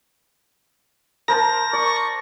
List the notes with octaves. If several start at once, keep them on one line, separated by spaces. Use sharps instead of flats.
A#4 C5 A5 A#6
D5 C#6